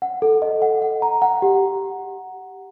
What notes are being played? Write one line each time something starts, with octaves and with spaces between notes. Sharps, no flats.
F#5
A4
D#5
F#5
F#5
A#5
F#5
G4